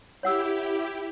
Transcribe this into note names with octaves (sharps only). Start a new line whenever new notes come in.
E4 G4 C#5 F#5 E6